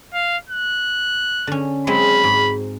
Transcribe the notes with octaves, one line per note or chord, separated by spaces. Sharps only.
F5
F#6
D3 C#4
F#3 G#3 C4 B5
G#2